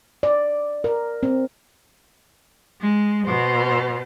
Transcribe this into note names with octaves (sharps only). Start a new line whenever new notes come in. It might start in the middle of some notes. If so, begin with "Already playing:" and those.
D5
A#4
C4
G#3
B2 C5